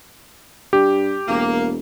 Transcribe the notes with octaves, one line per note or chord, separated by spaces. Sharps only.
G2 G4
E1 A#3